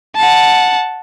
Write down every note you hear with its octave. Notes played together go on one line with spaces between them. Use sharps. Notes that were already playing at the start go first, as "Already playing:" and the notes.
F#5 A5